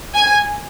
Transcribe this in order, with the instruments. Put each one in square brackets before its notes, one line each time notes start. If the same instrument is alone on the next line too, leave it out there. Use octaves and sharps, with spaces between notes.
[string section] G#5